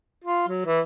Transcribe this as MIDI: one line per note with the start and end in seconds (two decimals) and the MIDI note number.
0.24 0.46 65
0.48 0.63 54
0.66 0.80 52